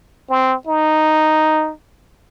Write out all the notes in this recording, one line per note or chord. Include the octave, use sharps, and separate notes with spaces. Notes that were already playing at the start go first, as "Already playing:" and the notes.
C4
D#4